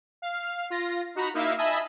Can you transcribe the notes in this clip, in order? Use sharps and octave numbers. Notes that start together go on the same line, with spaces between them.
F5
F4 A#6
D#4 F#4 A#5 B5
A#3 D#4 E4 E5 F5
D#5 E5 G#5 A5 B5